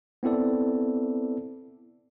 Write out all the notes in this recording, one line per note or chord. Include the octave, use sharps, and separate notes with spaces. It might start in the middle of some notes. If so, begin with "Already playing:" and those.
B3 C4 E4 A4 D5